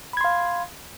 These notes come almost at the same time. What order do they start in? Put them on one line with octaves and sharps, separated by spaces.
B5 G#6 C6 F5